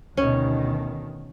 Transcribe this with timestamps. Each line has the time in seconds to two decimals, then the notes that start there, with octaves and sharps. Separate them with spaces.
0.17 D2 B2 D#3 C#4